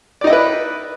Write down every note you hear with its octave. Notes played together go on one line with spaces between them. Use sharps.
D#4 E4 B4 D5 D#5